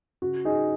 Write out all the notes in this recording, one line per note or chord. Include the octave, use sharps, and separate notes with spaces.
C#3 F#4
D#4 G#4